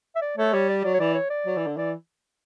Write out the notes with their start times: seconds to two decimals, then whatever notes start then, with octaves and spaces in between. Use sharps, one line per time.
0.16 E5
0.22 D5
0.37 A3 C#5
0.53 G3 C#5
0.69 D5
0.84 F#3 D5
0.94 C#5
1.00 E3 D5
1.15 C#5
1.30 D5
1.46 F#3
1.57 E3
1.67 D3
1.77 E3 D5